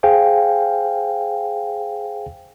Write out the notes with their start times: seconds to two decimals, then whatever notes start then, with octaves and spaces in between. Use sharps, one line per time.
0.03 G#4 C5 F5 G5 G#5